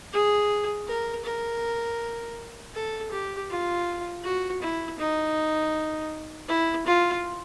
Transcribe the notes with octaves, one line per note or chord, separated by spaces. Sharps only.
G#4
A#4
A#4
A4
G4
F4
F#4
E4
D#4
E4
F4